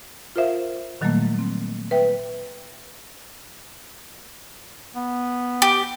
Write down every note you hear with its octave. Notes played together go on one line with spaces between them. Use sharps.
F4 A#4 C5 E5 F5
A#2 D#3 F#3 G3 A3 A#3
C4
B4 E5 G5
B3
G4